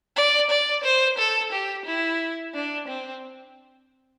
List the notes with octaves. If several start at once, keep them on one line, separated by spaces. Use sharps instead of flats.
D5
D5
C5
A4
G4
E4
D4
C4